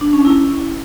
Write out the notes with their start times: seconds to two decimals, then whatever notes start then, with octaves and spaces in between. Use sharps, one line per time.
0.01 D4
0.13 C#4
0.25 E4